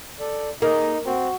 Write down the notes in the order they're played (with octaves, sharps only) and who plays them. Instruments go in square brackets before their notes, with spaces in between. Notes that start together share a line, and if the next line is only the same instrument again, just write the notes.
[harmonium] A4 D5
[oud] A#3 [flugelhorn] D#4 [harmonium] G#4 D#5
[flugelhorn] C4 [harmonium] F#4